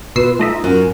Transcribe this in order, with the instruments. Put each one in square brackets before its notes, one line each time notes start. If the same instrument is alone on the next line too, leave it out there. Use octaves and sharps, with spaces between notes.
[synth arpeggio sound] B2 E6 C7 [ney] F4 [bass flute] B4
[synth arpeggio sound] A3 D#5 E5 [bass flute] D#4
[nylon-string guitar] F#2 [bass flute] A#4